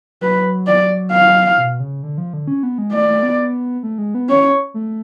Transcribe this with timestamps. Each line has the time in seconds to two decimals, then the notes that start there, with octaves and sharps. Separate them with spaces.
0.21 F#3 B4
0.67 D5
1.12 F5
1.58 B2
1.80 C#3
2.03 D3
2.18 F3
2.33 D3
2.48 C#4
2.63 B3
2.78 G#3
2.93 A3 D5
3.09 A3
3.23 B3
3.83 A3
3.98 G#3
4.15 B3
4.29 C#4 C#5
4.74 A3